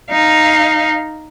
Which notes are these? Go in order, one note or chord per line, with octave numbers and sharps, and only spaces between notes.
D#4 F5